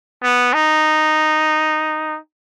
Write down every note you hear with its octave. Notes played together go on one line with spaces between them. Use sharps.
B3
D#4